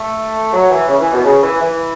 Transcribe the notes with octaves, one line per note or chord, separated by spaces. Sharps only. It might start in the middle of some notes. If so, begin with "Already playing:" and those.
Already playing: A3
F#3
E3
C#3
E3
B2
C#3
E3
E3